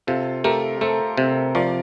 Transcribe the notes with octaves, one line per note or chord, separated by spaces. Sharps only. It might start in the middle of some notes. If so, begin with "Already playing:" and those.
C3 F4 A4
A3 G4 A#4
A3 A4 C5
C3
F3 A#4 D5